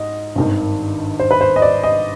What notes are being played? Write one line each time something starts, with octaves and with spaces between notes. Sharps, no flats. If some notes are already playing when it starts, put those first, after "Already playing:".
Already playing: G#2 D#5
G#1 G2 D#3
C5
B4
C5
D#5
D5
D#5